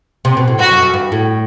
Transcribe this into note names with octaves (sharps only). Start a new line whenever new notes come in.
C3
B2
A2
G2 F#4
F#2
F#2
G2
A2